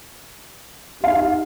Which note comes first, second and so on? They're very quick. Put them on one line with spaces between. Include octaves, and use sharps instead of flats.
G4 F5 D#4